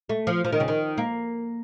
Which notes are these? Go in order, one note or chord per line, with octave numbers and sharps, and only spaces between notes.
A3
F3
F3
D#3
C#3
D#3
A#3